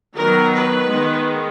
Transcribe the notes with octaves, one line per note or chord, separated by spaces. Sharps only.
D#3 F#3 B3 A#4
B4
D#3 G#3 B3